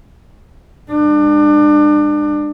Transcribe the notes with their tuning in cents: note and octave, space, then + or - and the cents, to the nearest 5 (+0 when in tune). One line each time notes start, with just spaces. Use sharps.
G#3 -35 D4 +30